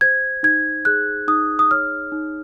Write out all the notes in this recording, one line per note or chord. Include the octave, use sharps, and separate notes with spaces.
C5 G#6
D#4 G#6
G#4 F#6
D#4 D#6
D#6
C#5 F6
D#4